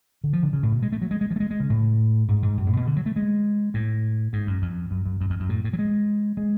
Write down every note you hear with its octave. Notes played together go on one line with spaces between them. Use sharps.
D3
F3
D3
C#3
A2
B2
G#3
A3
F#3
G#3
G#3
F3
A3
G#3
G#3
C#3
A2
G#2
G#2
F#2
A2
B2
D3
F#3
A3
G#3
A2
G#2
F#2
F2
F#2
F#2
F#2
F2
F#2
A2
A2
F#3
G#3
G#3